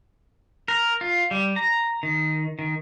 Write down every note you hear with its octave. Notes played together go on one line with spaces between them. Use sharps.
A#4
F4
G3
A#5
D#3
D#3